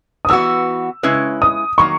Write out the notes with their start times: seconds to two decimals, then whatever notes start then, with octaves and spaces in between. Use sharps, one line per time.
0.25 D#6
0.28 E3 B3 F#4 E6
1.03 C#3 G#3 C#4 E4 B4
1.42 D#6
1.78 D#3 F#3 A#3 C#6